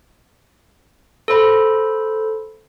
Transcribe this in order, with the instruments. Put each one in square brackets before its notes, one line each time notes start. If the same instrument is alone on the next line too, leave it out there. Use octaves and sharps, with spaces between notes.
[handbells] A4 C5 B5